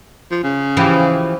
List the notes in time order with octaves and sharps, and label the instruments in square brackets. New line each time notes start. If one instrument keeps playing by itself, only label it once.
[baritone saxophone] F3
C#3
[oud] E3 F3 G4